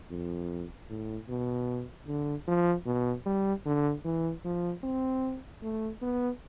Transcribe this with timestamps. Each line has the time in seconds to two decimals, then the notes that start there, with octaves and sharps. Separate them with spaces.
0.10 F2
0.90 A2
1.29 B2
2.08 D3
2.47 F3
2.86 B2
3.26 G3
3.65 D3
4.05 E3
4.45 F3
4.84 C4
5.62 A3
6.02 B3